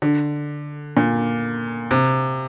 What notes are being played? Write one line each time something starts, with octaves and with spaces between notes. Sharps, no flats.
D3
A#2
C3